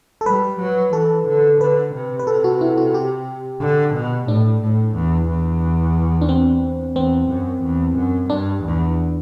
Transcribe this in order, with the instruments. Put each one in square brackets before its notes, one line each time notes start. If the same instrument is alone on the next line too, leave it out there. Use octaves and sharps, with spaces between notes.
[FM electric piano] A4
[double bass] G3 [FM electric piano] B4
[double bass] F#3
[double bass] E3 [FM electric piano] A4
[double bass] D3
[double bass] D3 [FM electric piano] B4
[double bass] C3
[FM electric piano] B4
[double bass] C3 [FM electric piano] A4
[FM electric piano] F#4
E4
F#4
G4
[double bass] D3
B2
[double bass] A2 [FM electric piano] D4
[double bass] A2
E2
E2
[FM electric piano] D4
C4
[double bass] E2 [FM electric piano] C4
[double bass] F#2
E2
F#2
[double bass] G2 [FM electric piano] D4
[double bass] E2